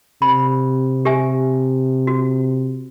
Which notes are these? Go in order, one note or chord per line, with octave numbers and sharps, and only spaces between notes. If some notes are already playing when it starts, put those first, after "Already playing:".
C3 B5
G4 E5 G#5
F#4